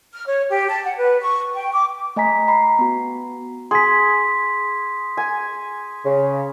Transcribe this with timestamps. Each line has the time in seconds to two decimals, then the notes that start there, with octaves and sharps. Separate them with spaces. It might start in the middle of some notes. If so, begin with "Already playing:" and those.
0.13 F6
0.27 C#5
0.49 G4
0.68 A5
0.84 F#5
0.97 B4
1.22 C#6
1.55 G5
1.73 D6
2.16 A3 D#5 G#5 A#5 B6
2.48 A#5 B5 C7
2.79 B3 F#4
3.71 G#4 C6 B6
5.17 G#5
6.05 C#3